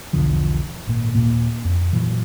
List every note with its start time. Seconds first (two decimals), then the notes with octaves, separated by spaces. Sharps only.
0.13 B1 E2 D3 F3
0.87 G#1 A#2
1.14 D#1 A#2 A#3
1.65 F2
1.93 A#2 E3 F#3